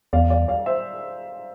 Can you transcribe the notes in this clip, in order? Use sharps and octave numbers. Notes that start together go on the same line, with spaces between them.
E2 D5 F5
D5 F5
D5 F5
C5 E5